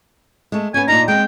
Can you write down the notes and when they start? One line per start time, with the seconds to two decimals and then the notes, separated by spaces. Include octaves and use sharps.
0.52 G#3 A3
0.74 B3 C#4 G#5
0.88 A#2 D4 D#4 A#5
1.08 G#3 C4 G5